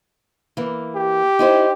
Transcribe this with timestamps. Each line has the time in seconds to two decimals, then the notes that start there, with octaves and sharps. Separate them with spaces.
0.57 E3 A#3
0.96 G4
1.39 D#4 E4 C5